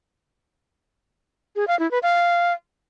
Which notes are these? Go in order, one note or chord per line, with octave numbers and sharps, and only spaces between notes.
G#4
F5
E4
B4
F5